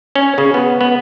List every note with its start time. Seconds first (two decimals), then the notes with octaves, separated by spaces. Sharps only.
0.15 C#4
0.38 C#3
0.54 B3
0.81 B3